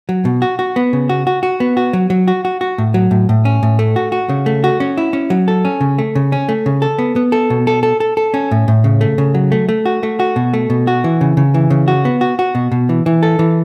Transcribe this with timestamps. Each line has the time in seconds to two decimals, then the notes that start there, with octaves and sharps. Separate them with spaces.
0.09 F#3
0.25 B2
0.42 F#4
0.59 F#4
0.76 B3
0.93 C#3
1.09 F#4
1.27 F#4
1.43 F#4
1.60 B3
1.77 F#4
1.93 F#3
2.10 F#3
2.28 F#4
2.45 F#4
2.61 F#4
2.78 A2
2.94 F#3
3.11 A2
3.29 A2
3.45 C#4
3.63 A2
3.79 A3
3.96 F#4
4.12 F#4
4.29 C#3
4.46 A3
4.64 F#4
4.80 C#4
4.97 E4
5.13 C#4
5.30 F#3
5.48 A4
5.65 C#4
5.81 C#3
5.98 A3
6.15 C#3
6.32 C#4
6.49 A3
6.66 C#3
6.82 A4
6.99 B3
7.16 B3
7.32 A4
7.50 B2
7.67 A4
7.83 A4
8.00 A4
8.17 A4
8.34 C#4
8.51 A2
8.68 A2
8.84 C#3
9.01 A3
9.18 C#3
9.34 F#3
9.52 A3
9.69 A3
9.86 F#4
10.03 A3
10.20 F#4
10.36 B2
10.54 A3
10.70 B2
10.87 F#4
11.04 E3
11.21 C#3
11.37 C#3
11.54 E3
11.70 C#3
11.88 F#4
12.05 B3
12.21 F#4
12.39 F#4
12.55 B2
12.72 B2
12.89 E3
13.06 E3
13.23 A4
13.39 E3